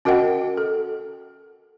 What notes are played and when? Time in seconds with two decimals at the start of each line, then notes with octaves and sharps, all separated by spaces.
0.05 C#4 F#4 A#4 D#5 F#5 G5
0.58 A4